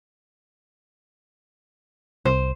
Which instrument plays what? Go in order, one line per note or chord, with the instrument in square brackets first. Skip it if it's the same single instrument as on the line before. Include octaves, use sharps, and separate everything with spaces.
[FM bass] C2 [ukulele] C5